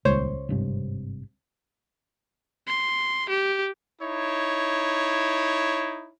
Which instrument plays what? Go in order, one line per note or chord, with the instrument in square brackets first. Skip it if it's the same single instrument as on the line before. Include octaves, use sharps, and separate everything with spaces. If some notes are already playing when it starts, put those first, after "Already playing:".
[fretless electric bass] D#1 [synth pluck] C#2 C5 C#5
[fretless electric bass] G#1 G2 C3
[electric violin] C6
G4
[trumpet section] D#4 E4 C#5